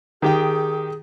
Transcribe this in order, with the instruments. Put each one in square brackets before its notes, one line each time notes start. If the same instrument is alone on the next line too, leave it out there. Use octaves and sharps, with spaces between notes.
[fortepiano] D#3 G4 G5 [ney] G#4